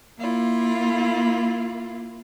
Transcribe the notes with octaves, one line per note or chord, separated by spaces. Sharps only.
A#3 E4 F4